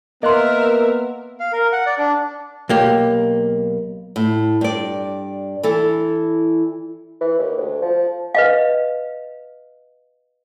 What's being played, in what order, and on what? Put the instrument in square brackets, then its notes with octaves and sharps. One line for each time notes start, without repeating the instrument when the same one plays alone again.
[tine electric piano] A#3 F#6 [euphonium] B3 [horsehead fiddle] A#4 E5 [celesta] D#5 C6
[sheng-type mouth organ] F5
A#4
F#5
D5
D4
[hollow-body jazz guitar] B1 A#3 G4
[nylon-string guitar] A2
G2 D5
E3 E4 A4
[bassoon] E3
D#2
D2
F3
[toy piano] B4 D#5 F5